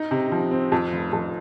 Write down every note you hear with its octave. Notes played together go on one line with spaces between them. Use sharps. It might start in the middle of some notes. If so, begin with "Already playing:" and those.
Already playing: D#4
C3
F3
C4
F2
F1
F2